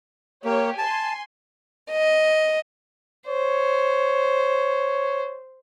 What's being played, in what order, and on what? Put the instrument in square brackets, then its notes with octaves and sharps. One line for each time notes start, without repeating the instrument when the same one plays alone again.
[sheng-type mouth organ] A#3 [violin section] G4 C#5
[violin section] G#5 C6 [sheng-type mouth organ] A5
[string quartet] D#5
[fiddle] C5 [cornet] C#5